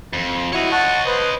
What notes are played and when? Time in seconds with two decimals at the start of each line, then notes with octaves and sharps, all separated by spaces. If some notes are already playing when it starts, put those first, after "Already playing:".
0.13 F2
0.53 E4 F#4 C#5 D#5
0.72 F#5 A5 C#6
1.06 B4 C5 D#6